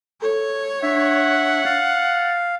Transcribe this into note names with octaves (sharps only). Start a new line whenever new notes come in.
A4 C#5
D4 E5 F#5
F5 A6